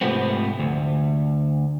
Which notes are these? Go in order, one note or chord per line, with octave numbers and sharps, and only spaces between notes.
G#2 C3 F3 A3 B3 C4
D2